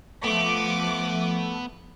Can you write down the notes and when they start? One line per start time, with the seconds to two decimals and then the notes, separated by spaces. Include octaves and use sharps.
0.24 F3 A3 B3 D6